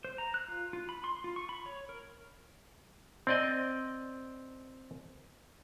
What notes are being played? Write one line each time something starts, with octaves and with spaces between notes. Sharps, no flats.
C5
A#5
F#6
F4
F4
B5
C6
F4
C#6
B5
C#5
A#4
C4 D5 D#5